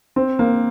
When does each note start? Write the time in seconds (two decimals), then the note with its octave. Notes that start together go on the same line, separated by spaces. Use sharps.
0.16 C4
0.39 A#3